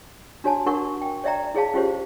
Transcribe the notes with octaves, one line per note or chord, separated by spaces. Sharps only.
D4 F#4 C#5 G#5 A5
D4 F#4 A#4 C#5 F#5 C#6
G5
C#5 D5 E5 G5 A#5
E4 G#4 C#5 F5 A5
C#4 F4 G4 C5 C#5